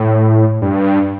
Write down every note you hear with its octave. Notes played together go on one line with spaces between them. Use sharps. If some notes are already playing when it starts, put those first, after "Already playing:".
Already playing: A2
G2